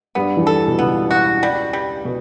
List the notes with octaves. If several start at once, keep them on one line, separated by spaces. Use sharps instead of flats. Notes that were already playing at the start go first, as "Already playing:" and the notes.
G2 G3 B3
E2 E3
A4
B2
C#2 C#3 B3
F#4
G3
G3
B2